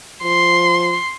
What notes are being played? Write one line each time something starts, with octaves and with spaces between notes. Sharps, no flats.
F3 C6